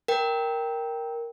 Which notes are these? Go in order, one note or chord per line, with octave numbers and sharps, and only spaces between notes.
A#4 G5